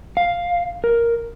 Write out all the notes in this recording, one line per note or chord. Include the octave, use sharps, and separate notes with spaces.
F5
A#4